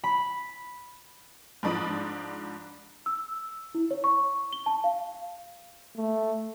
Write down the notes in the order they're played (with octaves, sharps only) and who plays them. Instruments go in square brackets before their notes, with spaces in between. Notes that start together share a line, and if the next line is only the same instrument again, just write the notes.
[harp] B5
[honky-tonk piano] G#2 F3 D4 B5 D#6
[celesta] E6
E4
C#5
C#6
G7
A5
F5
[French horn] A3